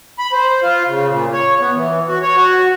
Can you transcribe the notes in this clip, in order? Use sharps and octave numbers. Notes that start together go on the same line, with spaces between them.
B5
C5
F4
C#3
A#2
C#5
B3
E3
F#4
C#5
F#4